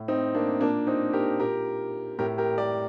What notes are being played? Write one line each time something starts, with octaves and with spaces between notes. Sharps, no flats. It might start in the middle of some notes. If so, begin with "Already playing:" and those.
Already playing: A2
C4 D#4
A#3 D4
A#2 A#3 D4
C4 D#4
G4 A#4
A#2 G4 A#4
A2 G4 A#4
G4 A#4
A#4 D5